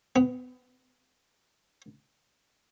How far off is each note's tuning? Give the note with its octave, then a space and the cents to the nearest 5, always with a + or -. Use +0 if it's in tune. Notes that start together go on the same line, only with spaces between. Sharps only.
B3 +30